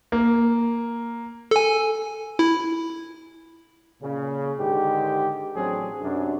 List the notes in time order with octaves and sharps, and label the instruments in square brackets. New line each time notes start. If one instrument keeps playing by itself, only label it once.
[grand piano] A#3
[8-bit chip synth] A4 G#5
E4
[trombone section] A#2 C#3
G#2 D3 D#3 G4
A1 F#3 C4 D4 G#4
F#2 C3 C#4 D4